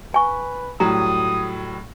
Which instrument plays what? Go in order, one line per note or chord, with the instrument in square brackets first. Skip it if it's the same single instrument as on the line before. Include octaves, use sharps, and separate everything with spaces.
[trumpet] B4 [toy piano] G#5 C#6
[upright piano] A2 F#3 G3 [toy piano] A#5 [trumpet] D#6